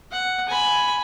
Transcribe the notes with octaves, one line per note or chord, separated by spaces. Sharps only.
F#5
G#5 B5